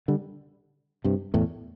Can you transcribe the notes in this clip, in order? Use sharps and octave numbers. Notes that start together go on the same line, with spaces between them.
D3 G3
G2 C3
E2 A2